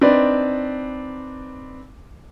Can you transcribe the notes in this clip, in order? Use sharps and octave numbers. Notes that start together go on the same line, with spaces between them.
C4 D4 D#4 B4 D5